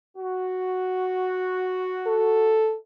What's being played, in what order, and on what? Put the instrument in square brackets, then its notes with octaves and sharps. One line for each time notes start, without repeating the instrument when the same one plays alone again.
[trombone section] F#4
[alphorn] A4